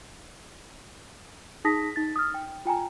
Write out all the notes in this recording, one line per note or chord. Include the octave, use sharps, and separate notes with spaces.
D#4 G#4 A5 D#6 A#6 B6
D#4 A6
D#6 F6
G5
F4 G5 G#5 A#5